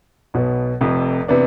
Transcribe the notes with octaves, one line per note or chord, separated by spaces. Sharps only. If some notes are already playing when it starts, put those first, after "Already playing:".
B1 B2 B3
F1 F2 C3
C3 E3 B3 D4